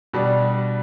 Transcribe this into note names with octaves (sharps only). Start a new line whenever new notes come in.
B2 G3 D4